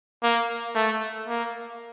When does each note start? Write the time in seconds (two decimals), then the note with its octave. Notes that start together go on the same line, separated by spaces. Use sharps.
0.23 A#3
0.75 A3
1.28 A#3